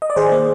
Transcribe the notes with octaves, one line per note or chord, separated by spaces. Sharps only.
D#5
D5
D#3 G#4 C5
A#3